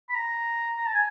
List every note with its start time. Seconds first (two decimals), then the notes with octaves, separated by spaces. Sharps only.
0.09 B5
0.15 A#5
0.77 A#5
0.86 A5
0.94 G#5